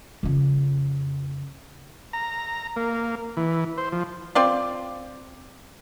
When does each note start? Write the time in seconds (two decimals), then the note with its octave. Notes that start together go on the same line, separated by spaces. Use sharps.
0.23 F2 C#3
2.13 A#5
2.76 A#3
3.37 E3
3.78 C5
3.92 F3
4.35 C4 F4 D5